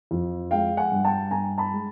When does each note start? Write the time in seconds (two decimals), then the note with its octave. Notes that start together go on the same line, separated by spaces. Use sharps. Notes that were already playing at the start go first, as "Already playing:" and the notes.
0.11 F2
0.51 G#3 F5 G5
0.77 F#5 G#5
0.92 G2
1.05 G5 A5
1.31 G2 G#5 A#5
1.58 A5 B5
1.72 G#3